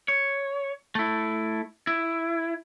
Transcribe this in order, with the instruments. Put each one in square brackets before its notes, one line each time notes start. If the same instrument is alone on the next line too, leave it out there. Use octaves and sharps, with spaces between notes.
[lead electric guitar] C#5
A3 E4
E4